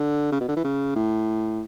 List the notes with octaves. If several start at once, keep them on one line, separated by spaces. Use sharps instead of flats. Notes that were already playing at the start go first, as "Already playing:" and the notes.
Already playing: D3
C#3
B2
D3
E3
C#3
A2